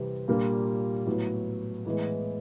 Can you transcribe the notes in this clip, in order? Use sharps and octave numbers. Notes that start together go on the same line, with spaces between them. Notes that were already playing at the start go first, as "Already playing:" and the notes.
Already playing: C3 E3 G3 C4
A#2 G3 A#3 D4 F4
A2 F#3 B3
A2 E3 G#3 B3